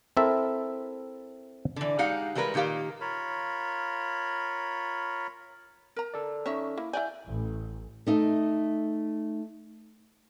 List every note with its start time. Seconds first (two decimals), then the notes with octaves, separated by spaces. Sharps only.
0.17 C4 E4 A4 A#4 E5
1.76 D3 E3
1.99 G#3 D#4 G4 F5 F#5
2.35 E3 G3 G#3 A#4 B4
2.54 A#2 D#3 A#3 G4 F5
3.01 F4 A#4 C#5 B5
5.96 A#4 A#5
6.14 A4 D5
6.46 C#4 D#4 C#5 E5
6.78 A#3 E4
6.93 E4 D5 F#5 G#5 G6
7.27 A1
8.07 A3 D#4 D#5